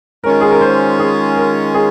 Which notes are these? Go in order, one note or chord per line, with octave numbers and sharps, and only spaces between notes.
D#3 G#3 C#4 F4 A#4
G#4
A#4
C5
G#4
A#4
G#4